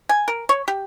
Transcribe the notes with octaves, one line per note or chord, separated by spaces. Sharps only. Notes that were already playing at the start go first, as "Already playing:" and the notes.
G#5
A#4
C#5
G4